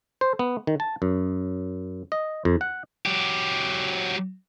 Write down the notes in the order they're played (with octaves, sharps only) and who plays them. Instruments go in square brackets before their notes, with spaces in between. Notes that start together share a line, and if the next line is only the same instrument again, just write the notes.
[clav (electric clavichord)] C5
B3
D#3
A5
F#2
D#5
F2
F#5
[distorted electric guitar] F#3 G4